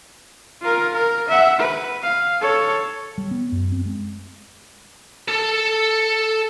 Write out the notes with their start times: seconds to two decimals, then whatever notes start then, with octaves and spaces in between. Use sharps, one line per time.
0.61 F4 A#4
0.93 A#4
1.28 E5 F#5
1.59 B4
2.02 F5
2.41 A4 C#5
3.18 G3
3.31 B3
3.52 F#2
3.72 C4
3.86 G#3
5.28 A4 A5